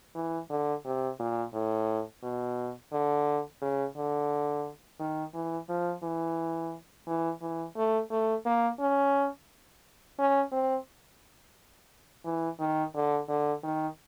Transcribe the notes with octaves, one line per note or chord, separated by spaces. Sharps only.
E3
D3
C3
A#2
A2
B2
D3
C#3
D3
D#3
E3
F3
E3
E3
E3
A3
A3
A#3
C#4
C#4
C4
E3
D#3
D3
D3
D#3